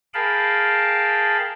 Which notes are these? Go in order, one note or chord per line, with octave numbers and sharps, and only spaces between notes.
G#4 A#4 F5 G5 A5 B5